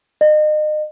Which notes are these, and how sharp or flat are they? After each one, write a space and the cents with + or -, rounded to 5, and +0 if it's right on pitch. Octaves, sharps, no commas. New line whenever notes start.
D#5 -35